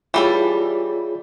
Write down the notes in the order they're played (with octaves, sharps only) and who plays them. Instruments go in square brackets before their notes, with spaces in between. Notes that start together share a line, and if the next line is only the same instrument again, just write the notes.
[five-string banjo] E3 G3 A4 [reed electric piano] F4 G#4 C#5